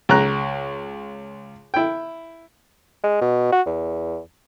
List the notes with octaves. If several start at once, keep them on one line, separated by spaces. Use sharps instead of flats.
C#2 A#5 F#6
E4 G5
G#3
B2
F#4
E2